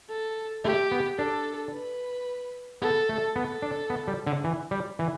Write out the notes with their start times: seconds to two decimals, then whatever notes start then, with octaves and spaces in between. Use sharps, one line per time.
0.10 A4
0.65 A3 G4
0.91 B3
1.19 D4 A4
1.73 B4
2.82 B3 A4
3.09 A3
3.36 B3 A4
3.62 D4
3.90 B3
4.08 G3
4.27 D3
4.44 E3
4.71 G3
4.99 E3